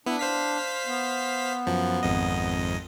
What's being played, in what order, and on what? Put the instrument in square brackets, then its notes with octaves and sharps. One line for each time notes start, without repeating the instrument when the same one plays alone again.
[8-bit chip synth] B3 E4 [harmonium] D4
[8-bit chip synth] C5 F5 B6
[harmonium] B3
[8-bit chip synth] F#2 F3
G#1 F2 D#5